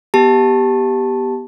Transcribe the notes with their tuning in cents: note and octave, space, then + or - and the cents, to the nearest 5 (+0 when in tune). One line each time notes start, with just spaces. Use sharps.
B3 -10 G4 +0 A5 +0